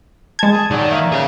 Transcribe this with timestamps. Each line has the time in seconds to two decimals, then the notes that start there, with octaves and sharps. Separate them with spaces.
0.39 G#3 A5 G#6
0.51 G#4
0.71 D#3 F#3 D5
0.91 A#3 E5
1.12 G#4 C#5